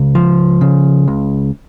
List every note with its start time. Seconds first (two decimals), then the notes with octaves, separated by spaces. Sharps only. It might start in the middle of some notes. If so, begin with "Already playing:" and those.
Already playing: C#2
0.15 F3
0.61 C#3
1.08 C#2